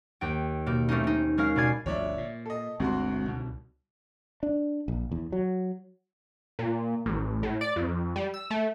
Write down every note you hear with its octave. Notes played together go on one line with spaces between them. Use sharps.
D#2 D#4 G5
B2 A#3 G6
A3 A#3 C4 C#4 D#4
A#3 D#4
G#3 C#4 A#4 F5 F6 C7
B2 D#4 D5 G#5 G#6 C7
G1 D2 F3 C#5 D5 E5
A#2
A4 D#5
G1 D2 G#3 C4 F#4 C6
C2 B2
D4
A#1
E2
F#3
A#2
A1
A2
D5
F2
G3
E6
A3